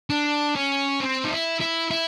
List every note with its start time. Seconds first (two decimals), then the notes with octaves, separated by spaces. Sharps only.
0.10 D4
0.55 C#4
1.00 C4
1.25 D#4
1.31 E4
1.61 E4
1.91 E4